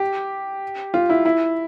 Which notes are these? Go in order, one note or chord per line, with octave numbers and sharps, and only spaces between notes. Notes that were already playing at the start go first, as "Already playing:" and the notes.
Already playing: G4
F4
E4
E4